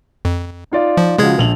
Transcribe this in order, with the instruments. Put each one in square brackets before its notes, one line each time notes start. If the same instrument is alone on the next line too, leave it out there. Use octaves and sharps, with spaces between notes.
[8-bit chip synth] F2
[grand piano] D#4 F4 D5
[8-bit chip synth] F3
[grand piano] C#3 F3 F#4 [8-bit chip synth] G#3 G#4 G#6
[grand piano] A#1 F7 F#7